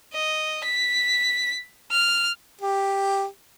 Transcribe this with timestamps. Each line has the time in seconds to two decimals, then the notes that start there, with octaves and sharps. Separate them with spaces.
0.14 D#5
0.64 B6
1.92 F6
2.61 G4